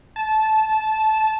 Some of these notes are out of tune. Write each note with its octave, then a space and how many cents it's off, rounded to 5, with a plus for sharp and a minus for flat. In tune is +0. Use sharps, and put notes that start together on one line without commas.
A5 -15